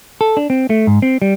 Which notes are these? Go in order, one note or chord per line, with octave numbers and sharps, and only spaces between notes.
A4
D4
C4
A3
G#2
C4
G3